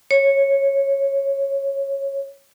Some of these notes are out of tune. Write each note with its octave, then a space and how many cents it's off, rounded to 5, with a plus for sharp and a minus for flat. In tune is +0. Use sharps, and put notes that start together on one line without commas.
C#5 -15